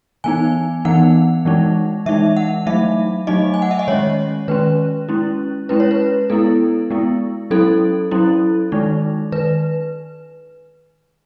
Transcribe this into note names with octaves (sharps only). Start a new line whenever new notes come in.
E3 B3 D#4 G#5
E3 B3 D#4 F#5
E3 G#3 D#4
E3 G#3 D#4 E5
F#5
F#3 A3 D#4 E5
F#3 A3 D#4 D#5
G#5
F#5
E5
D#5
D#3 G#3 C#4 C#5
D#3 G#3 C#4 B4
G#3 C#4 E4
G#3 C#4 E4 B4
C#5
B4
G#3 B3 E4 A4
G#3 B3 E4
F#3 C#4 E4 A4
F#3 C#4 E4
D#3 G#3 D#4
D#3 B4